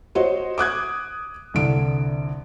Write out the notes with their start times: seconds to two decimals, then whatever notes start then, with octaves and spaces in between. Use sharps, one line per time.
0.15 F#4 C5 C#5 D#5
0.58 D6 D#6 F#6 G#6
1.54 C2 D3 D7